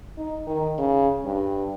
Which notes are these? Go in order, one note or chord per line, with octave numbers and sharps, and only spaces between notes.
D#4
D#3
C#3
G2